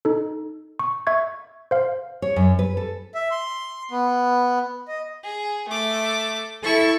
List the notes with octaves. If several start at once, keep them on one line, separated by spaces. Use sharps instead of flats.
D#4 A4
C#6
E5 C#6 G#6
C5 F5
C#5
F#2
B4
A4
E5
C6
B3
D#5
G#4
A3 D6
E4 A4 E5 C#6